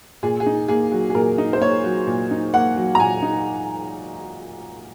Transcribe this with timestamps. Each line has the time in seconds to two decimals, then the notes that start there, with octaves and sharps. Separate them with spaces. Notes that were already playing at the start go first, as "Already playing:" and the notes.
0.23 A#2 G#4
0.40 G#4
0.46 D#4
0.68 A#3 G#4
0.92 F#3
1.10 G#4
1.15 A#2 A#4
1.38 D#4
1.53 C5
1.61 A#3 C#5
1.84 F#3
2.07 A#2
2.31 D#4
2.53 A#3 F#5
2.76 F#3
2.95 A#5
3.00 A#2 G#5
3.22 D#4